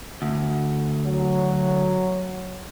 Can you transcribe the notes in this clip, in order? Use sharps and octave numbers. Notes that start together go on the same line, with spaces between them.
D2
F#3